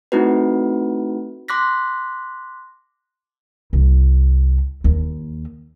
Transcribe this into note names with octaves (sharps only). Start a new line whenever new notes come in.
A3 C4 D#4 E4 F#4 B4
C6 D6 F#6 A#6 B6
C2
D#2